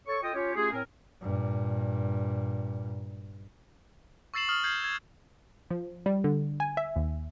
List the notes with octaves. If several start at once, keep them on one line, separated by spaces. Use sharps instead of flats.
A4 C#5 C#6
F4 A4 D#5 G5 D#6
C#4 F4 G4 C#5
A3 C#4 F4 G4 G#4
A2 C4 A#4 G#5
G2 A#2
C#6 E6 A6 C7 E7 F#7
C#6 D#6 F6 F#7
F6 G6 G#6 C7
G#6
F3
G3
D3
G#5
E5
D#2